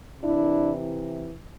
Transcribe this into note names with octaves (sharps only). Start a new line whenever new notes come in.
C3 E3 D4 E4